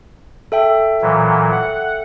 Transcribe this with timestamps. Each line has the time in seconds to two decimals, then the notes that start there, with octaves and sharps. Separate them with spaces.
0.52 A4 E5 G5
1.02 A#2 E3 F#3
1.52 F#5